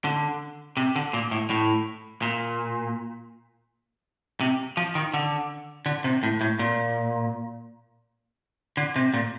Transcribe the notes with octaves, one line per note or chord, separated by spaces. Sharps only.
D3
C3
D3
A#2
A2
A2
A#2
C3
F3
D#3
D3
D3
C3
A2
A2
A#2
D3
C3
A#2